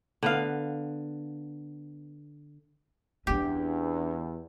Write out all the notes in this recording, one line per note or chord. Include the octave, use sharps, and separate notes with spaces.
D3 B3 F5
E2 C#4 D4 G4